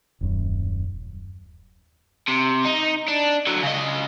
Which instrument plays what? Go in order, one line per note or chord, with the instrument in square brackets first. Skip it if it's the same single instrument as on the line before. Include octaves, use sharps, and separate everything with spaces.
[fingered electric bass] D#1 F#2
[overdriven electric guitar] C3
D#4
D4
D3 F#3
C#3 D#5